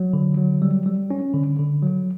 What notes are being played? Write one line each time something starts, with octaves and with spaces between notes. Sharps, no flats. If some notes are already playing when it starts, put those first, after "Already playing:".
Already playing: F#3
D3
F#3
G3
G3
C#4
D3
D3
F#3